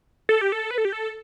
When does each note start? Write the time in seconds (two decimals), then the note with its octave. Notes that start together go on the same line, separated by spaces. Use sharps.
0.29 A4
0.41 G4
0.52 A4
0.71 B4
0.78 A4
0.85 G4
0.92 A4